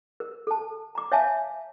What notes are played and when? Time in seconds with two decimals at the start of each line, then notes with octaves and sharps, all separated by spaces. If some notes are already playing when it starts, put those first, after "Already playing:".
0.20 A#4
0.47 A4 A5
0.95 A#5 D6
1.12 C#5 E5 F5 G#5 A5